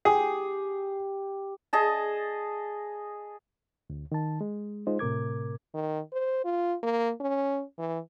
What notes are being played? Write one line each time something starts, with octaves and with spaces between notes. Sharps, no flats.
G4 G#4
G#4 D#5 A5
D2
D#3 A5
G#3
G#3 D#4 F4 C5
A2 C3 A#4 D6 G#6
D#3
C5
F4
A#3
C#4
E3